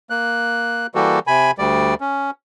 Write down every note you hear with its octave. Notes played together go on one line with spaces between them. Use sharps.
A#3 F#6
E3 G3 A#3 F#4 G4 A4
C3 G#5 B5
D2 G3 D5
C#4